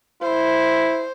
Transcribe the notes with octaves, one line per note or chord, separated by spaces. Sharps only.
E4 C5